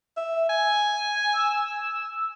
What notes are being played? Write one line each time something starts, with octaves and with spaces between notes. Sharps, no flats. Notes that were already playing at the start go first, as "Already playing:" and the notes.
E5
G#5
E6